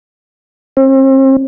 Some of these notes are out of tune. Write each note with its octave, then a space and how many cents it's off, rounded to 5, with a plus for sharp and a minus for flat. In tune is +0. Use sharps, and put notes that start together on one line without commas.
C4 +40